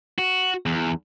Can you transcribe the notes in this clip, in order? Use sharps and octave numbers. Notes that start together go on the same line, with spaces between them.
F#4
E2